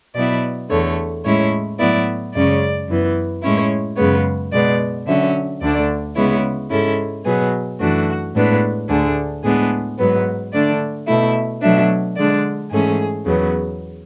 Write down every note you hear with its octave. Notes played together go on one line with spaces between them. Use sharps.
B2 F#3 B3 E4 D5
E2 D3 A3 C#5
A2 G#3 C#4 E4 C#5
A2 F#3 B3 E4 D5
F#2 C#3 G#3 C#4 D5
F#2 E3 B3
A2 G#3 C#4 E4 C#5
F#2 C#3 G#3 B3 C#5
B2 G#3 B3 D5
D3 F#3 C#4 E5
D2 D3 A3 D4 D5
C#3 G#3 B3 E4 C#5
G#2 G#3 C#4 E4 A4
B2 F#3 B3 G#4
F#2 E3 A3 D4 F#4
A2 G#3 B3 D4
D2 D3 A3 D4 G#4
A2 G#3 B3 D4 G#4
G#2 F#3 B3 B4
D3 A3 D4 D5
B2 A3 E4 E5
B2 F#3 A3 D4 E5
D3 G#3 D4 D5
G#2 E3 A3 C#4 G#4
E2 C#3 F#3 B3